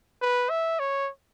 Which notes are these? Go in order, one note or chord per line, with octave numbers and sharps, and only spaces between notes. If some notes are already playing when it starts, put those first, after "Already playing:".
B4
E5
C#5